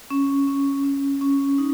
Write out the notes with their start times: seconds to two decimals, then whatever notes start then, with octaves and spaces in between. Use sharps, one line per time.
0.10 C#4
0.47 C#4
0.84 C#4
1.21 C#4
1.58 D#4